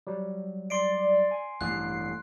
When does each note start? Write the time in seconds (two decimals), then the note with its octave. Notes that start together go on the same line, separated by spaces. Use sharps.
0.07 F#3 G3
0.70 D5 C6 C7 D7
1.31 G#5
1.61 A1 G2 F#6 C7